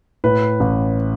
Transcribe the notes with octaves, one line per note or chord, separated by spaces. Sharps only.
A2 B4
A1